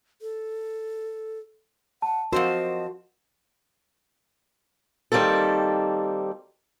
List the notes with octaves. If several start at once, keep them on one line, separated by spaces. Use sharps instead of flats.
A4
F#5 A5
F3 C4 F#4 A#4 C5 D#5
D#3 G3 A#3 C4 A4